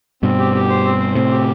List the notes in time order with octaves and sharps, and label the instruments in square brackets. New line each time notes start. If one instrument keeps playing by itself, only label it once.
[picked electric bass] G2 B2 [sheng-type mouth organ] C4
[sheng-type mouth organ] G4
G4
C5
C4
C5
[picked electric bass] A2 C3 [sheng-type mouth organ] C4
[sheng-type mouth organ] G4